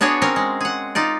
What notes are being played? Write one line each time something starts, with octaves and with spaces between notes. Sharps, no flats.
B3 D4 F#4 G#4 C#5
C4 C#4 A#4
G#3
G#4 F#5
D#4 F4 D5